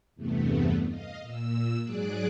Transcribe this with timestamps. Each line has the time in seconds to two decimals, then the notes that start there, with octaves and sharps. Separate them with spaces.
0.15 E2 G2 C3 A3 B3
0.88 D#5 F5
1.22 A#2 E6
1.82 G#2 F#3 G#4 D5 D6 F#6